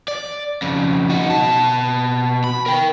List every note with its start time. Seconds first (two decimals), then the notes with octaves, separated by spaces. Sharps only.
0.08 D5
0.62 F2 C#3
1.10 D#4 F#4
1.30 B2 A5
2.44 B5
2.66 A#4 G5